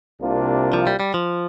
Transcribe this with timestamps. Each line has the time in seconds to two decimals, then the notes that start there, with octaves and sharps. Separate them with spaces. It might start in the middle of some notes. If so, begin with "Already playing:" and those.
0.20 C2 C3 A#3 D4 F4
0.73 F3
0.87 G3
1.00 G3
1.14 F3